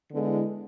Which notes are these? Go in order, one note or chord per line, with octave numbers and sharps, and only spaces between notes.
D3 G#3 B3 E4